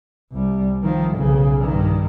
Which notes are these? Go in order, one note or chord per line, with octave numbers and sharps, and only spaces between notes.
C2 G3
D#3 F3
B1 C#3
G2 D#3